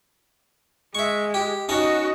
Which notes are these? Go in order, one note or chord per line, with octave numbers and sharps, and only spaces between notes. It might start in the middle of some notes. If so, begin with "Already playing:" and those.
G#3 E5 C#6
G4
C#4 D#4 F#4 D#5 A5